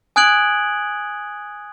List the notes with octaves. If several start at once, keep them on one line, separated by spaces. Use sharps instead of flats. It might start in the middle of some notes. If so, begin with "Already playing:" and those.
G#5 D#6 F#6 G#6 D7 F#7